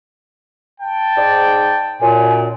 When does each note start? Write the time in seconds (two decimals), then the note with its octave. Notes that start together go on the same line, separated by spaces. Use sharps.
0.81 G5 A5
1.17 G#2 D5
2.01 F#2 A#2 G#5